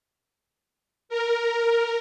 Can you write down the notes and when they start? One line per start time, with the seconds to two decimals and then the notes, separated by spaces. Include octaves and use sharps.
1.09 A#4